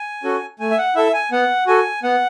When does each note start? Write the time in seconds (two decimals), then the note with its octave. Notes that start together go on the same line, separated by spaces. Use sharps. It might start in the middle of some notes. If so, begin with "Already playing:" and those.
Already playing: G#5
0.24 C#4 F#4 A4
0.60 A3 G#5
0.71 E5
0.78 F#5
0.96 E4 A4 E5
1.13 G#5
1.32 B3 F#5
1.67 F#4 A4 G#5
2.03 B3 F#5